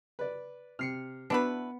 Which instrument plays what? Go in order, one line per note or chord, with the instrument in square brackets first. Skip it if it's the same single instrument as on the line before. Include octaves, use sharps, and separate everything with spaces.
[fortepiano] B4 D5
[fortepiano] C3 [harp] F6 C7 C#7
[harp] B3 [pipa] D4 E4 B4 [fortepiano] F#4